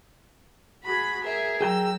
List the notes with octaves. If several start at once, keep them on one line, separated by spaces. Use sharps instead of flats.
F#4 G#4 B5
G#4 A#4 E5
F#3 G#4 G5 A#5 E6